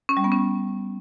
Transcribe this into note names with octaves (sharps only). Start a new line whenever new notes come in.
C#4
G3
B3
C#4